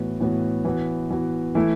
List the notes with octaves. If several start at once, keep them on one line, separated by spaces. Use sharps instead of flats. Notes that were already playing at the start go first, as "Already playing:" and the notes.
Already playing: A2 E3 B3 F#4
A2 E3 B3 F#4
E3 B3 F#4
E3 B3 F#4
E3 A3 E4